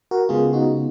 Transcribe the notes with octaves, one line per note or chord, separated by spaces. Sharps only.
F#4 A#4
C#3 G#3 B3 F4 G#4
D#4 F#4